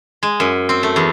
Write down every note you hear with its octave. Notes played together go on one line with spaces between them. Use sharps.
G#3
F#2
C4
A3
E2